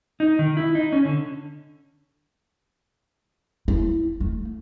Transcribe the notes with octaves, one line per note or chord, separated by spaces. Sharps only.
D#4
D#3
E4
D#4
C#4
D3
E4
A3